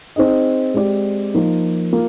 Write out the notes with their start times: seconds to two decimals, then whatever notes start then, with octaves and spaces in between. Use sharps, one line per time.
0.16 C4 D#4 G#4 D#5
0.74 G#3 C4 G4 D5
1.34 F3 A#3 D#4
1.93 A#3 F4